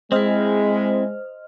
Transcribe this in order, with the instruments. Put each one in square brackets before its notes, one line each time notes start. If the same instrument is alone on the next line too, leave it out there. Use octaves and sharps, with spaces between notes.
[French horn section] G#3 [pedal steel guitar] C4 E4 [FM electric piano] C5 D#5 F6